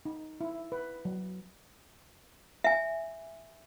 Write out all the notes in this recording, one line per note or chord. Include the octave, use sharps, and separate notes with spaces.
D#4
E4
B4
F#3
E5 G#5